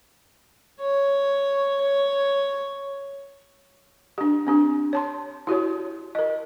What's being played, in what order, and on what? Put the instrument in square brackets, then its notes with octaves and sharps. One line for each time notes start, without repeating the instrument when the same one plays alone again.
[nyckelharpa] C#5
C#5
[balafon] D4 G4
C4 D4 G4
C#5 A5 C6
E4 F#4 G4 C#5
A#4 D#5